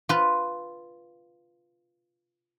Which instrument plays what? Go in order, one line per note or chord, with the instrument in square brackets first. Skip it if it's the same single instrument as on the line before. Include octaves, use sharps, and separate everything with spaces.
[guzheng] F4 B4